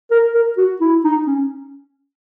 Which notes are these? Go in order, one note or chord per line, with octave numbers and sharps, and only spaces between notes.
A#4
A#4
F#4
E4
D#4
C#4